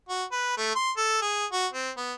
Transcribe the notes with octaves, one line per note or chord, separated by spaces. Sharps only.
F#4
B4
A3
C6
A4
G#4
F#4
C4
B3